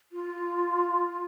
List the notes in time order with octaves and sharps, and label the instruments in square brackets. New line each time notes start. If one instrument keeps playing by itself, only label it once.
[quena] F4